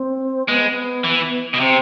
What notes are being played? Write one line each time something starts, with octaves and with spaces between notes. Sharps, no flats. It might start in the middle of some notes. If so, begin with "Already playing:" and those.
Already playing: C4
G#3 B3
E3
B2
C3 C4